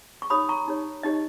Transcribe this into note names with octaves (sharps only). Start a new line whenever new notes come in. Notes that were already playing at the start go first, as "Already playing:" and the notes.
C#6
D#4 G4 C#5 B5 D#6
A#5 C#6
D#4 G4 C#5
D#4 G4 C#5 D#5